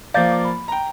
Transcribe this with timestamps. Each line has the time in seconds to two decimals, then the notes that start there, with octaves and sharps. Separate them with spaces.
0.14 F3 A#3 D5 F5 G6 A6
0.32 D6
0.45 B5
0.68 G5 A#5